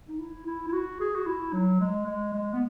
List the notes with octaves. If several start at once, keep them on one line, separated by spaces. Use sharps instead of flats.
D#4
E4
E4
E4
F#4
G#4
F#4
E4
F#3
G#3
G#3
G#3
B3